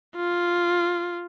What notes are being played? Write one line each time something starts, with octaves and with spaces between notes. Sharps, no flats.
F4